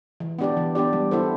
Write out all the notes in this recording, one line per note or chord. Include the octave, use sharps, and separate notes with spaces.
E3
B3 D4 G4 D5
E3
B3 D4 G4 D5
G3
B3 E4 A4 C5